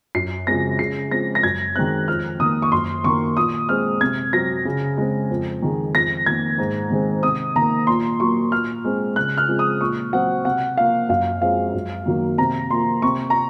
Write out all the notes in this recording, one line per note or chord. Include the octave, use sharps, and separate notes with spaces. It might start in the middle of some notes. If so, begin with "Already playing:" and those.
F#2 C7
C#3 F3 G#3 C4 A#6
C#3 C7
F3 G#3 C4 A#6
A#6
F#2 G#6
D#3 G#3 C4 F#6
F2 F6
D#3 A#3 D#6
C#6
F#2 C6
D#3 A#3 C#6
A#2 D#6
G#3 C4 F6
C3 G#6
F#3 C4 A#6
C#3
G#3 C4
F2
D#3 G#3
F2 A#6
D#3 A#3 G#6
G#2
D#3 G#3 C4
C3 D#6
D#3 A#3 A#5
A#2 C6
F#3 A#3 C#6
A#2 F6
G#3 C4
C#3 F#6
F6
F3 G#3 C4
D#6
A#2 C#6
F#3 C4 F#5
C3 F#5
F3 A#3 F5
F#2 F5
F3 G#3 C4 F5
F#2
D#3 F#3 A#3
C3 A#5
F3 A#3 C6
C3 C#6
A#5